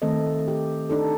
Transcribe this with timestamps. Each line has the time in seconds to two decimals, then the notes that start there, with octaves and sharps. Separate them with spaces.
0.02 D#3 A3 C4 A4 D#5
0.48 G4
0.90 D4 D#4 A4